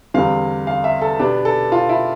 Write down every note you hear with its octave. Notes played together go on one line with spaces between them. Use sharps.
E2 D3 G3 C4 F5
F5
E5
A4
B2 B3 D4 G4
A4
F4
E4